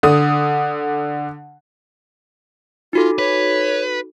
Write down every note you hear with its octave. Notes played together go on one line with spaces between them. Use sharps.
D3 D#6
D#4 F4 F#4 A4
B4 C#5